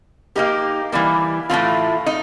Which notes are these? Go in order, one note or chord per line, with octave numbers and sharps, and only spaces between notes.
A#3 D#4 G4 A#4
E3 G3 A#3
A2 E3 A3 C4 F4
D#4